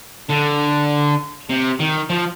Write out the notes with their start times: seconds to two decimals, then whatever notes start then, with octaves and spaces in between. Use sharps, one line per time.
0.29 D3
1.49 C3
1.79 D#3
2.10 F3